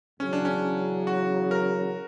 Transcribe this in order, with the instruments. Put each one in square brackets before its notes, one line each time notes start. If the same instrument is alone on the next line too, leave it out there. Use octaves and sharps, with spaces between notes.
[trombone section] E2 C#3 F#3 [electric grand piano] C#4
[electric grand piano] D4
C#4
F#4
A#4